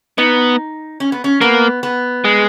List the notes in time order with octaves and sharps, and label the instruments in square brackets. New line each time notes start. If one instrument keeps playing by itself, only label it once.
[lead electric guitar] B3 [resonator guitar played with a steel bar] D#4
[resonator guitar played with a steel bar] C#4
B3
C#4
[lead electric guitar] A#3 [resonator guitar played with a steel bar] B3
[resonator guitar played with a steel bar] B3
[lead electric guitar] G#3